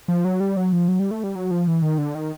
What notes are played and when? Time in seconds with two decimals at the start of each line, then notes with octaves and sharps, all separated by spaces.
0.08 F3
0.25 F#3
0.40 G3
0.57 F#3
0.73 F3
0.88 F#3
0.99 G3
1.11 A3
1.24 G3
1.36 F#3
1.51 F3
1.67 E3
1.82 D#3
1.98 D3
2.15 D#3